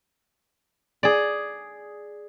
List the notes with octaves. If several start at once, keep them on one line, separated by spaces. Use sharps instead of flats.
G#4 D5